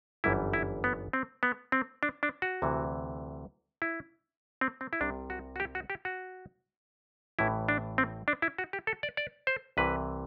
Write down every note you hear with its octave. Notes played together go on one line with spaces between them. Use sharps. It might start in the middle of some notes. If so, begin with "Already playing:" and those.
G1 F#2 E3 G3 E4
E4
B3
C4
B3
C4
D4
D4
F#4
D2 C3 E3
E4
C4
C4
E4
C2 C3 G3 D4
F#4
F#4
G4
F#4
G4
F#4
A1 A2 E3 E4
D4
C4
D4
E4
F#4
G4
A4
D5
D5
C5
C2 C3 E3 B4